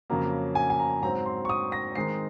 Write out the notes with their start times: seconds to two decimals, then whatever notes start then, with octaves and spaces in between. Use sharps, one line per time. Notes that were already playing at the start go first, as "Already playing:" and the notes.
0.10 F2 C#3 F#3 A#3 A#5
0.55 G#5
0.70 G#5
0.79 A#5
1.03 G#2 F#3 C4 A#5
1.26 C6
1.45 C#6
1.49 D#6
1.72 A#6
1.95 D#3 G#3 C4 D#4 C7